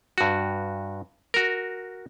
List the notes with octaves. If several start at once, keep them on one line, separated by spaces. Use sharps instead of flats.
G2 F#4
F#4 A#4